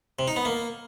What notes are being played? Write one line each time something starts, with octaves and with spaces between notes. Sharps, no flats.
C3
D#4
B3
A#3